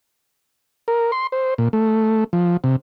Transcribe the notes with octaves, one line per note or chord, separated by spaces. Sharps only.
A#4
C6
C5
A#2
A3
F3
C3